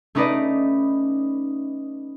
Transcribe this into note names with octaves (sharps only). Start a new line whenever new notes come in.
A3 C#4 D#4 B4 D5 D#5